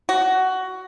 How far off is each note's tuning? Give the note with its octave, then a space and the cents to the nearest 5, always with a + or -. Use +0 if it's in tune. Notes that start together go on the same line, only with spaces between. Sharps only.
F#4 +15